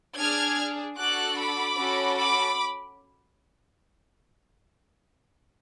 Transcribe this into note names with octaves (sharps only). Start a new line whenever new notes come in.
D4 G#4 F6 G#6
D4 F#4 A4 D6 F#6
B5 D6
C#4 F#4 A4
B5 D6